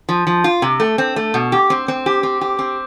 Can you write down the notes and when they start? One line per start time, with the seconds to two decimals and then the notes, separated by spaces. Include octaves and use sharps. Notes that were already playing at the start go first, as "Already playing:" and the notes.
0.09 F3
0.27 F3
0.44 F4
0.62 C3
0.80 A3
0.98 C4
1.16 A3
1.34 B2
1.52 G4
1.70 C4
1.88 C4
2.06 G4
2.23 C4
2.41 G4
2.59 C4